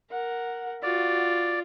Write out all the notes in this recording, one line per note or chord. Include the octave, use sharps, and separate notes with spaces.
A#4 F#5
F4 F#4 D5